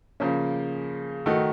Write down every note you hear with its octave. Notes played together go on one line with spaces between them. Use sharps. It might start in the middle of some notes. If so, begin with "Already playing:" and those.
C#3 F3 A#3 C#4
D#3 A3 D#4 F#4 A4